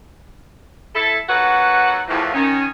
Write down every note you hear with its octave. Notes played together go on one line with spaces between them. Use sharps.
E4 A4
D#2 F#3 F#4 A4 B4 F#5
E2 A2 E3 F3
D#3 C#4